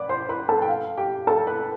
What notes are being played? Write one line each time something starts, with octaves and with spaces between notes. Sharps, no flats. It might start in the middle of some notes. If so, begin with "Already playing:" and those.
Already playing: B4 D5 B5 D6
C5 C6
B4 B5
A4 A5
G5
F5
G4 G5
A4 A5
B4 B5